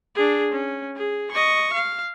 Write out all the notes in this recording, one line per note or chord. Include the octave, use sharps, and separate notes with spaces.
D4 G#4
C#4
G#4
D#5 C#6
F5